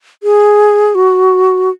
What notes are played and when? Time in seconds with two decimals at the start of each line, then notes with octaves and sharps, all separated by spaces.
0.23 G#4
0.95 F#4